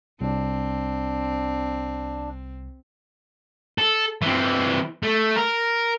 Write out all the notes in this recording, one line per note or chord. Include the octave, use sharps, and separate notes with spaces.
C2 C4 D4
A4
E3 C4
A3
A#4